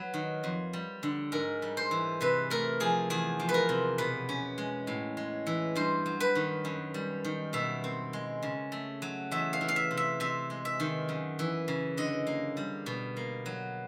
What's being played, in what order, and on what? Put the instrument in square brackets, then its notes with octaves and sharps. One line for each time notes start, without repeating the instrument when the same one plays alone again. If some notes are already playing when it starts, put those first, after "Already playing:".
Already playing: [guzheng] F#3 B4
D#3
F2
G3
D3
G#2 A#4
G3
C5
E3
C3 B4
A3 A#4
F3 G#4
E2 G#4
F3
B4
A#4
C3
B2 B4
C#4
G#3
A2
G#3
E3
G2 C5
F#3
B4
D#3
F#2
G3
D#3
B2 E5
C4
G#3
C#3
A3
F#3
E2 E5
F5
E3
F5
E5
C3
E5
C3 E5
G#3
E5
D#3
F#2
E3
C#3
D3 D#5
A#3
G3
B2
A#3
F#3